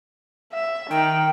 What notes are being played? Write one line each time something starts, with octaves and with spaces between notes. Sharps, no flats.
E5
D#3 G5